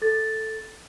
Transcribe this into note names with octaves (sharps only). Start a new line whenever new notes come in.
A4 A6